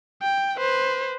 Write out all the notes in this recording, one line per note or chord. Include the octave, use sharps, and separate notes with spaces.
G5
B4 C5